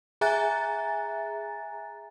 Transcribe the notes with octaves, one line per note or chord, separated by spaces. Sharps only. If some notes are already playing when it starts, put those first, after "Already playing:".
G#4 E5 G#5 A#5 F#6 A6